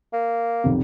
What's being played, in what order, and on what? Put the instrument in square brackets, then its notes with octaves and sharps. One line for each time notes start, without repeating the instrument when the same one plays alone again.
[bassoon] A#3
[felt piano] B1 F2 C3